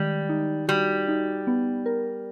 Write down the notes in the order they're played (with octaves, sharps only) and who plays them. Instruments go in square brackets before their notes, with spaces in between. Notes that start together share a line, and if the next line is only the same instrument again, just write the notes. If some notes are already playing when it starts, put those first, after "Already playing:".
Already playing: [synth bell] D#3 G#3 [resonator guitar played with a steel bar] G3
[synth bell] D#4
[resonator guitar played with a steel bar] G3 [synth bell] F#4
[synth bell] D#4
B3
A#4